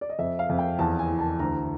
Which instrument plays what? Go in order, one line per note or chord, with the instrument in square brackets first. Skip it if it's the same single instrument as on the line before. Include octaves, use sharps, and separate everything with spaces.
[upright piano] D5
D#5
F2 E5
F5
F2
G5
E2 A5
G#5
E3
A5
D2 A#5